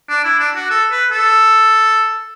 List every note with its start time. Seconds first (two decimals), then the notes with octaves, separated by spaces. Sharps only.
0.09 D4
0.24 E4
0.39 D4
0.55 F#4
0.70 A4
0.91 B4
1.11 A4